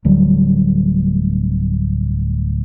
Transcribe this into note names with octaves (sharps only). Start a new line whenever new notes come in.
D1 D2 F#3 G3